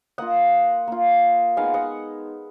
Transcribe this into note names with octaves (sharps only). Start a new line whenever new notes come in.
A#3 F4 D#5 F#5
A#3 F4
G#3 B3 D#4 F5 G#5
D#5 F#5